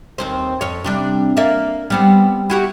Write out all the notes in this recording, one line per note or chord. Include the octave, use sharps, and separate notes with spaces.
D#2 C4 C5
F2 C#5
C3 G3 D4
A#3 D5 E5
G3 B3 C4
E4 F#4 G4